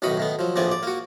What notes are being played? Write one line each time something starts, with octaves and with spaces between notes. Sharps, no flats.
B1 A2 D#3 F#4 B5 D#6
A2 D#3 B3
F3 F#3
A#1 A2 F3 B3 D5 G#5
D5
A#3 F#4